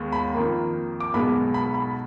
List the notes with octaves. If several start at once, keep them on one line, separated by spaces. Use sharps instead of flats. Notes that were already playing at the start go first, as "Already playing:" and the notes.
Already playing: D#2 D#3 G#3 B3
B5
F2 D#3 A#3
D6
B1 B2 G#3 B3 B5
B5
B5